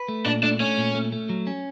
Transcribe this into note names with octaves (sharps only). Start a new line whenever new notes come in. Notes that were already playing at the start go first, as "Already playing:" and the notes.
Already playing: B4
A3
A#2 D4
A3 D4
A3 C#4
A#2
A3
A3
F#3
C#4